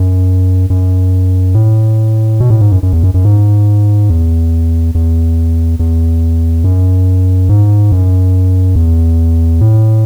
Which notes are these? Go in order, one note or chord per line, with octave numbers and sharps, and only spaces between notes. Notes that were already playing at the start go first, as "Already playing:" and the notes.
Already playing: F#2
F#2
A2
B2
A2
G#2
F#2
F#2
E2
F#2
F#2
G#2
E2
E2
E2
F#2
G#2
F#2
E2
A2